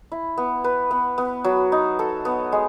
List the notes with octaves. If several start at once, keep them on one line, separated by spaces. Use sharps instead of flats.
E4
B3
B4
B3
B3
F#3
D#4
A4
B3
G#3